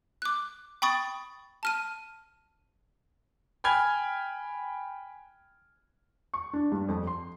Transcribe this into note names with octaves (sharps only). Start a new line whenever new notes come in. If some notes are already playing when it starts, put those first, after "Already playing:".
D6 F#6
G5 B5 C#6 D#6 A6
A5 F6 D#7
G5 G#5 B5 F6 G#6
C#6
D4
G2
F2
C6